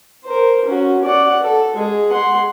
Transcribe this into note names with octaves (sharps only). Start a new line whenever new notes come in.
A#4 C5
C#4 F#4
D5 F#5
A4
G#3 G#4
F#5 C6